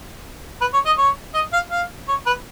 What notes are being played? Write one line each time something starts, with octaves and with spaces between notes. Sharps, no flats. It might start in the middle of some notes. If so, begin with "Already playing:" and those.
B4
C#5
D#5
C#5
D#5
F5
F5
C#5
B4